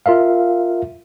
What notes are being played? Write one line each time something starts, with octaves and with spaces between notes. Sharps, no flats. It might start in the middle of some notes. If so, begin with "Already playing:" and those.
F4 A#4 E5 F5